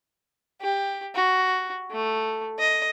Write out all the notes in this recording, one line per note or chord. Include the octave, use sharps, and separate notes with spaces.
G4
F#4
A3
D#5